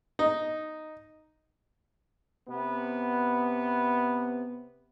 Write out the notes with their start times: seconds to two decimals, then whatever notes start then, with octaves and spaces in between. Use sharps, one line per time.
0.19 D#4
2.48 C3 B3